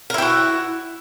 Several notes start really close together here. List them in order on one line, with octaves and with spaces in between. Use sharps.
A#4 E4 G4 F#4